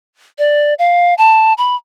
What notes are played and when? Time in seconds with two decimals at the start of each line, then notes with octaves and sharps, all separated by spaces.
0.39 D5
0.79 F5
1.18 A5
1.58 B5